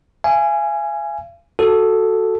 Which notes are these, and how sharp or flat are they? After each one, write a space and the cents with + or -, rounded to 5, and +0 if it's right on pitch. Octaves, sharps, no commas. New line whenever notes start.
F5 -45 G#5 +0
F#4 +0 A4 +0